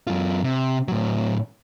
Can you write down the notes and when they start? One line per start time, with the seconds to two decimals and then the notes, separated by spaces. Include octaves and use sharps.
0.07 F#2 F4
0.43 C3
0.88 A2 F#3